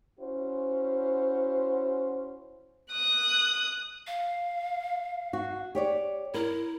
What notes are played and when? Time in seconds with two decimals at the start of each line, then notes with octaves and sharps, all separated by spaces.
0.19 C#4 E4 F#4 C5
2.92 D#6 F#6
4.07 F5
5.33 F#4
5.75 G4 C#5 D5
6.34 E4 A#4